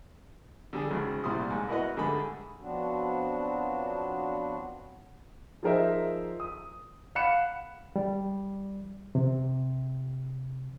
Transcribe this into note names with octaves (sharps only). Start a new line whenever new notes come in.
D3 G3 G#4
G#1 G#2 C#3
C2 A#2 G3 E4 C6 D#6
A1 G#2
E4 F#4 A#4 B4 D#5 F#5
G#2 D3 G3 A3 G#4 B5
F3 F#3 B3 C4 D4 F#4
F3 D#4 G#4 A#4 C5 E5
D#6
F5 F#5 B5 F#6 C#7 E7
G3
C3